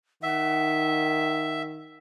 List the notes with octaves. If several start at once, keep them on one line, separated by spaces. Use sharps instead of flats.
D#3 E5 F#5